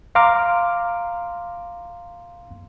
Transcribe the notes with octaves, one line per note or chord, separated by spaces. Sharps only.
F5 A#5 C6 D6 F6